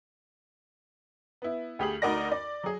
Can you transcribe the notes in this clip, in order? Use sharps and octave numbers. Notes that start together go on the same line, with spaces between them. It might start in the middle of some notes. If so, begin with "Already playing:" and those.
B3 E4
D2 G4 G#4 F#7
D2 D#4 F#4 A#4 D5 A#6
D5
F#3 G#4